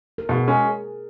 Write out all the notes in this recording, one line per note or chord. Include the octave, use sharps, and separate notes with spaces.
A#4
B2 G#4
G#3 C#4